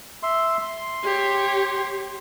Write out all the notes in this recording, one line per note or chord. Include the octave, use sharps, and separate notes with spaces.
E5 C6
C6
G4 C#5